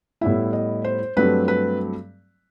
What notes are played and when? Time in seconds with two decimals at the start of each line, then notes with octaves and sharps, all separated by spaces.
0.21 A2 G3 B3 E4 E5
0.53 D#5
0.84 C5
1.17 G2 F#3 A3 C4 B4
1.48 B4